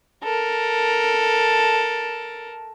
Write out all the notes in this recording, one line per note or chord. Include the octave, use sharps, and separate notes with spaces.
A4 A#4